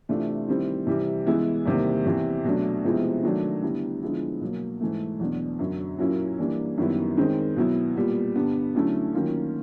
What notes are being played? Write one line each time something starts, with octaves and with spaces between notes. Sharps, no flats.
C3 E3 A3 D4 F4
D#3 G3 C4 E4
C3 E3 G3
E3 G#3 B3 E4
E2 C3 D#3 G3 A#3
E2 C3 E3
B2 F#3 A3 D4
C3 F3 G#3 B3 E4
D#3 F#3 A3 D4
D3 G3 B3 E4
D3 F3 G#3 B3 E4
B2 F#3 A#3
G#2 E3 A3
E2 B2 F#3 B3 D4
F#2 D3 F#3
A#2 F#3 A#3 C#4 E4
E3 G3 A#3 D4
F#2 D#3 G3 B3 E4
D#3 G#3 C4
B2 F#3 B3 E4
A#2 G3 B3
G2 D3 G3 B3
D3 F#3 A3 C#4 E4
D#3 F#3 A#3 C#4 F4